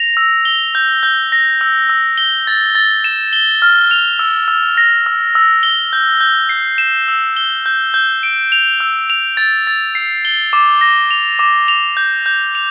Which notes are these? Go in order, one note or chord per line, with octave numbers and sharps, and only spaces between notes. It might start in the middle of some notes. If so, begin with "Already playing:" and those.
Already playing: A#6 F7
E6
G7
G6
G6
A#6
E6
E6
G7
A6
A6
E7
G7
F6
F7
E6
E6
A#6
E6
E6
G7
G6
G6
C7
E7
E6
G7
G6
G6
D7
F7
E6
F7
A6
A6
C7
G7
D6
A#6
F7
D6
F7
G6
G6
F7